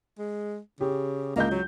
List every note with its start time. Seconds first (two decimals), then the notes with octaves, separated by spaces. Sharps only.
0.19 G#3
0.81 C#3 G4
1.36 C#2 A#3 D#5 G6
1.51 F#3